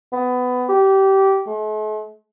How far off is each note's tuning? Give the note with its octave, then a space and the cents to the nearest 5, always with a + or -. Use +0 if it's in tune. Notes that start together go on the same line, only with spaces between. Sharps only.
B3 +20
G4 -20
A3 -45